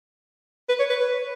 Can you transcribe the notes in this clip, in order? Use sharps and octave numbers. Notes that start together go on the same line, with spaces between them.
B4
C#5
B4
B4